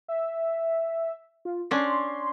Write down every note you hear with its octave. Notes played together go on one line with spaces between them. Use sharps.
E5
F4
C#4 D4 C6